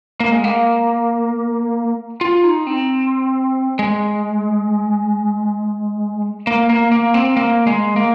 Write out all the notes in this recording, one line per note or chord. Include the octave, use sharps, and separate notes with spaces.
A#3
G#3
A#3
F4
D#4
C4
G#3
A#3
A#3
A#3
C4
A#3
G#3
A#3